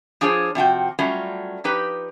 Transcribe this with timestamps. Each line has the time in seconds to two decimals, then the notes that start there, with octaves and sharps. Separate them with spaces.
0.21 F3 D4 F4 G#4 C5 C#5
0.55 C3 F3 F#4 G5
0.99 F#3 G3 A3 C#4 F4
1.64 F3 D#4 G4 B4